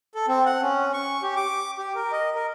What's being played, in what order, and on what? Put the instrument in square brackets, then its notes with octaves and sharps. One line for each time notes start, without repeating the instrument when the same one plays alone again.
[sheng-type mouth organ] A4
C4
F#5
C#4
C#6
G4
D6
G4
A#4
D#5
A#4